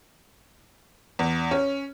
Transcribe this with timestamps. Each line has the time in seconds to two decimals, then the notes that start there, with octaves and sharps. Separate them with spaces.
1.19 E2
1.51 C#4